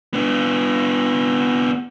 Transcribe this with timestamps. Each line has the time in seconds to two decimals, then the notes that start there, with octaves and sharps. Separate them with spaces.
0.14 B3 D4